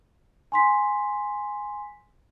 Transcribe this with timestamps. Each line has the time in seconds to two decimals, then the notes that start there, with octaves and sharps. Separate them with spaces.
0.52 G#5 C6 B6